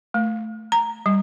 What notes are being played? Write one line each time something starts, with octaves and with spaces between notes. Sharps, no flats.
A3
A#5
G3